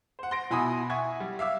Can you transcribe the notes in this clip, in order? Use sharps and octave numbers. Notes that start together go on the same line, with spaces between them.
C5 F#5
C6 A#6 D7
B2 E4 G#5 B5 C6 D#6
E5 F#5 G#5 C#6 G#6
G3
E5 F5 D6 E6